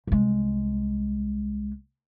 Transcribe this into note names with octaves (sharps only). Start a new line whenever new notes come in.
C2 G#3